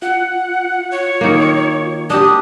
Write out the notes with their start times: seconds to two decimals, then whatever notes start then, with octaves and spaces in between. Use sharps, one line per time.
0.02 F4 F#5
0.91 C#5
1.21 D#3 A#3
2.10 D4 G4 D#6